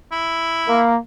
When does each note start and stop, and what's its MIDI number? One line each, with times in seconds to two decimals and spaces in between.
0.12 0.92 64
0.68 0.96 58